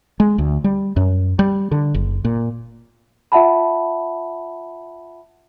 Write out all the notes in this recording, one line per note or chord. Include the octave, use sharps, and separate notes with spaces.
G#3
D2
G3
F#2
G3
D3
F#1
A#2
F4 E5 F#5 A5 B5